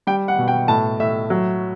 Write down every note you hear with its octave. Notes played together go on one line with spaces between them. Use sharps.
G3 G5
F#5
B2
G5
A2 A5
A2 E5
F#3